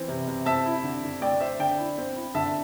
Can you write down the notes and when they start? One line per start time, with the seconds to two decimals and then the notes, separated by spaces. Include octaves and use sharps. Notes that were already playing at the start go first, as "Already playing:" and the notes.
Already playing: E3 C4 E4
0.08 C3
0.28 C3
0.46 C4 E5 A5
0.66 E4
0.84 D3
1.03 D3
1.21 A3 D5 G5
1.40 C4 C5 E5
1.59 D3 D5 G5
1.79 E4
1.98 C4
2.16 E4
2.35 D3 E5 A5